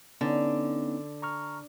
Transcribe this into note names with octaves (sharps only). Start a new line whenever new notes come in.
D3 B3 C#4 D#4
A#5 C#6 F6